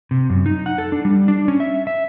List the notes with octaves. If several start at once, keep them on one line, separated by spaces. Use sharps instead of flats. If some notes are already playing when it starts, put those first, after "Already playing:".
C3
F#2
D#4
F#5
A4
D4
G3
D4
C#4
E5
E5